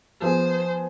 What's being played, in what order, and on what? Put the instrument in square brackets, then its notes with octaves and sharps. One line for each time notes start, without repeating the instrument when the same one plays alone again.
[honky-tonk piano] F3 B3 G#4 [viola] C5